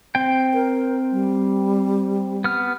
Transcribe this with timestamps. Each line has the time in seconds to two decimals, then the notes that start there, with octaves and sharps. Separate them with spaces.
0.15 C4 G5
0.54 A#4
1.12 G3
2.44 B3 F6